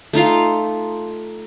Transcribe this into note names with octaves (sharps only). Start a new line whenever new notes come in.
A3 D#4 F4 F5